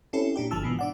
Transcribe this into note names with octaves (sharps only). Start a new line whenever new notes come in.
C4 C#4 E4 G4 A4
A#2 D4 G4
G1 D3 F3 F4 A5 E6
G#2 B2 D#3 E3
D4 D5 F#5